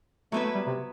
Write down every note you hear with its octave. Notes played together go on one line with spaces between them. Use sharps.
F#3 A3 B3 E4 B4
A3
G3
C3